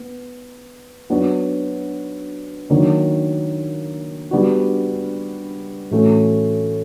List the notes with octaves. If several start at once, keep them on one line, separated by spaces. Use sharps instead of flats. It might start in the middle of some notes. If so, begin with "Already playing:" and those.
Already playing: B3
F#3 B3 D4 F#4
D#3 F#3 A#3 D4
G3 B3 D4 F#4
A2 E3 A3 C#4 F#4